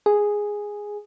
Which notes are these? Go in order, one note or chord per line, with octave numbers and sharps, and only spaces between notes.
G#4